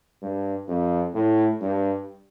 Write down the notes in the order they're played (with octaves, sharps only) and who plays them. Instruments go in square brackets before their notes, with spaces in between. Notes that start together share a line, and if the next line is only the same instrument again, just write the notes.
[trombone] G2
F2
A2
G2